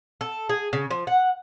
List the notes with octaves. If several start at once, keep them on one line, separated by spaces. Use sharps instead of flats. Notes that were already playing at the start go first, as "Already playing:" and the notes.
A4
G#4
C#3
F3
F#5